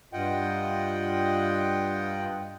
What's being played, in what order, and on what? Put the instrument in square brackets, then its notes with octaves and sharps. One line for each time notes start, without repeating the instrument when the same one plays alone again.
[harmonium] G2 F4 D#5 F#5 G5